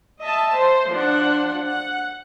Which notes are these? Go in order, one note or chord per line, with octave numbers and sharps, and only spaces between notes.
D#5 E5 A5
C5
F3 D4 F#5
F#5